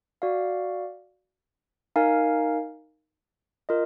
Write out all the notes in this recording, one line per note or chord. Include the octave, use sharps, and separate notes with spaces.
F#4 D5 F5
D#4 A#4 F5 G#5
F4 A#4 D#5